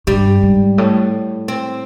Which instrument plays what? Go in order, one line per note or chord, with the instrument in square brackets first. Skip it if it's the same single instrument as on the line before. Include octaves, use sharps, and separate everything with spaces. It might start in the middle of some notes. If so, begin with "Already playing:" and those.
[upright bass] G2 [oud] G3
[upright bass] G#2
A2
[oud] C4